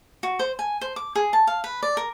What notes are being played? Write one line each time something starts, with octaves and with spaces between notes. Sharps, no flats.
F#4
C5
G#5
C5
D6
G#4
A5
F5
B4
D5
A#4